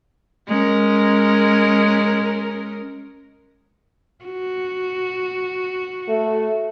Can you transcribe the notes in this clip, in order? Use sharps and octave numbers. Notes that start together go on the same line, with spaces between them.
G#3 C#4 A#4
F#4
A3